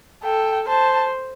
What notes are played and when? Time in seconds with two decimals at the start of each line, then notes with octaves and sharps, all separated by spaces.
0.24 A4 G5
0.68 C5 A5